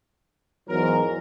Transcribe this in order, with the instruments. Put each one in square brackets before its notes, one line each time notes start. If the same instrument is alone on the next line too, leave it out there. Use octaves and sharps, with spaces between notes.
[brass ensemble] E2 G#2 F#3 [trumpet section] A#4